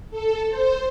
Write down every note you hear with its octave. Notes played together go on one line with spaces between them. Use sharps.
A4
C5